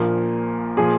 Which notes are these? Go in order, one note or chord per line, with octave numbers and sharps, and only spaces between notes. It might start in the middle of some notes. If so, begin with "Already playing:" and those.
Already playing: A#1 A#2 F3 A#4
A#2 F3 G#4